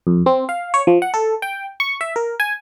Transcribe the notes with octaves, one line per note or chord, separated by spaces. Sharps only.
F2
C4
F5
C#5
F3
F#5
A4
G5
C#6
E5
A#4
G#5